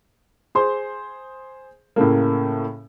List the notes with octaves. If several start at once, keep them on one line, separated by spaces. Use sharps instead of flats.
G#4 C5 C6
A2 C#3 A3 A#3